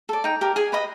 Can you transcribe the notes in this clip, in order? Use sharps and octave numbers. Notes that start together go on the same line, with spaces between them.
A4 D5
D#4 G5
G4 A#4
G#4 G#5
B4 D#5 B5